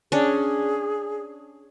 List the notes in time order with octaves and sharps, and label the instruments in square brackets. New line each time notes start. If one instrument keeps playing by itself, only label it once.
[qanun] C#4 D4 [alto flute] G#4